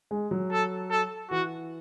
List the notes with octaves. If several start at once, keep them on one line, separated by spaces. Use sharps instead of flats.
G#3
F#3
A4
A4
E3 F#4